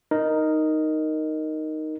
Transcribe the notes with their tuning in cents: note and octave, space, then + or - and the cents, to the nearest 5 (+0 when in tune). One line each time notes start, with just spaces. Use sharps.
D#4 +0 A#4 +0